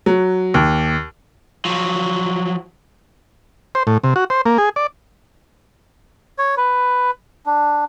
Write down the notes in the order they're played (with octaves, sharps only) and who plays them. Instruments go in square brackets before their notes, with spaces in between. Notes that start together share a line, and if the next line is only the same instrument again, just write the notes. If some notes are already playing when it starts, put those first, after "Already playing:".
[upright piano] F#3
D#2
[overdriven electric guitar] F3 F#3
[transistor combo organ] C5
A2
C3
F#4
C5
A#3
G#4
D5
[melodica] C#5
B4
D4